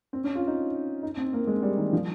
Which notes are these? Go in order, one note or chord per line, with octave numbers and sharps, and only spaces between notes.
C4
C#4
F4
D#4
D#4
C4
A#3
G#3
G3
D#3
F3